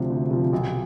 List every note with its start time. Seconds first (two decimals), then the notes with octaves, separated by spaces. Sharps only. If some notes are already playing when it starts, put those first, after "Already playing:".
Already playing: D2 C3 F3
0.10 D2
0.31 C3 F3
0.53 B1